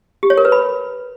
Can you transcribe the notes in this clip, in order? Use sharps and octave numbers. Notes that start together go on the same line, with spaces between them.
G4
C#5
A#4
B4
B5